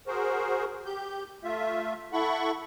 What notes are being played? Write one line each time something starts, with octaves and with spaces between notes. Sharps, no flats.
F#4 G#4 A#4 C5
G4 G6
A3 F4 E5
E4 A4 F#5 B5 C#6